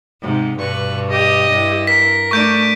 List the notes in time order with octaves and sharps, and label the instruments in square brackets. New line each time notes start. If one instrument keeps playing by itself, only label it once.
[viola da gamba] G#2 C3
[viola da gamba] G2 B2 [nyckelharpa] B4 C#6
[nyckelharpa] G4 D#5
[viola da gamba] G2 E4
[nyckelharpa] A#4 [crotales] B6
[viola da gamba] A3 D4 [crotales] C#6 G6 D7